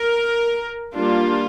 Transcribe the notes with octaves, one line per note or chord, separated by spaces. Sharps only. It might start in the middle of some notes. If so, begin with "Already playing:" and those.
Already playing: A#4
G3 A#3 D4 F4